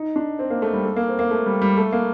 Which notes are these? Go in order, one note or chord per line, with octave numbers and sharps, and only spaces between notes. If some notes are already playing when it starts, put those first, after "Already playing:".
Already playing: D#4
D4
C4
A#3
A3
G3
A3
A#3
C4
A#3
A3
G3
G3
A3
A#3